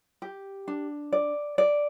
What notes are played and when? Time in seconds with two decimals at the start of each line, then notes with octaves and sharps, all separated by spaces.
0.22 G4
0.68 D4
1.13 D5
1.58 D5